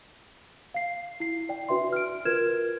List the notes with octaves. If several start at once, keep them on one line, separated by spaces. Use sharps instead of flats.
F5 C7
E4 C7
D5 G5
D4 F#4 B4 E5 C6
F6 D7
F4 A#4 B4 F6 G#6 E7